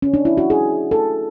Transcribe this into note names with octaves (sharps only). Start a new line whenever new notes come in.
C#4
D4
E4
F#4
G#4
A4